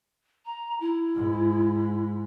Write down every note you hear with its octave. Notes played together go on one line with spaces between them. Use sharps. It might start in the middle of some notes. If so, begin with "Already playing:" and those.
A#5
E4
G#2